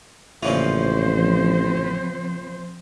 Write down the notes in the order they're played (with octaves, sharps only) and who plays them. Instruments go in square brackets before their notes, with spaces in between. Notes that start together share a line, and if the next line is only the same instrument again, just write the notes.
[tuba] A1 [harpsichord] A#2 C#3 E3 [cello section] F3 C4 C5